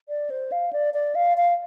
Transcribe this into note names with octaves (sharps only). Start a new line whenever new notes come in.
D5
C5
F5
D5
D5
F5
F5